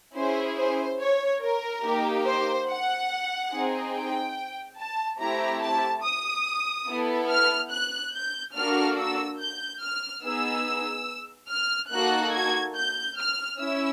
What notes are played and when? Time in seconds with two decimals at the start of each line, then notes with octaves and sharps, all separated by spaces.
0.15 C#4 E4 G#4 C5
0.57 C5
1.00 C#5
1.42 A#4
1.83 A#3 D#4 G4
2.25 C5
2.68 F#5
3.51 C4 D#4 G#4
3.93 G5
4.78 A5
5.19 A3 C4 E4 G4 A#5
5.61 A5
6.03 D#6
6.88 B3 E4 A4
7.30 F6
7.72 F#6
8.14 G6
8.55 A#3 D4 F#4 A4 F6
8.98 E6
9.40 G6
9.82 F6
10.23 B3 D#4 G#4 E6
11.50 F6
11.91 A#3 D#4 F#4 A4 F#6
12.34 G#6
12.76 G6
13.18 F6
13.59 C#4 E4 E6